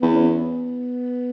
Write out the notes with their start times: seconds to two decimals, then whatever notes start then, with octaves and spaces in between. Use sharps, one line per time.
0.01 E2 B3
0.13 C#4
0.25 B3